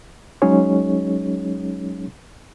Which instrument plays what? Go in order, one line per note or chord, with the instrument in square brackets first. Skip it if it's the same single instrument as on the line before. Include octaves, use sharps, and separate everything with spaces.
[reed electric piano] F#3 G#3 C#4 D#4 G#4 C#5